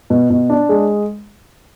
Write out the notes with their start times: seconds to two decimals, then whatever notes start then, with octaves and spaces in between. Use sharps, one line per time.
0.10 B2
0.30 B2
0.50 D4
0.69 G#3